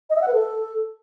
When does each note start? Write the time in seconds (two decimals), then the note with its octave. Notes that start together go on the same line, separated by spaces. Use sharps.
0.10 D#5
0.16 E5
0.22 F#5
0.28 B4
0.34 A4